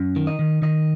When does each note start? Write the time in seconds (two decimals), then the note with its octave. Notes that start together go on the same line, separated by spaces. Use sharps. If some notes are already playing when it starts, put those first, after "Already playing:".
Already playing: F#2
0.16 D#3
0.27 D#5
0.39 D#3
0.62 D#3 D#5